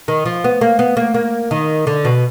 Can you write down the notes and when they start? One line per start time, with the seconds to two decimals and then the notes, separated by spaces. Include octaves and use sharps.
0.08 D#3
0.26 F3
0.44 B3
0.61 A#3
0.79 B3
0.97 A#3
1.14 A#3
1.51 D#3
1.87 D3
2.05 B2